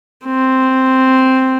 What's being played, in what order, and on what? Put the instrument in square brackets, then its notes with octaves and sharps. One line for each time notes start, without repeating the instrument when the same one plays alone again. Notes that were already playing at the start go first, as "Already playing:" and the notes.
[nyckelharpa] C4